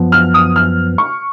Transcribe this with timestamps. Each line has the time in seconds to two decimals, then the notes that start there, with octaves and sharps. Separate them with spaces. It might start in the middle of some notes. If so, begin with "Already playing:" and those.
Already playing: F#2 F3 B3
0.12 F6
0.34 D#6
0.56 F6
0.98 C#6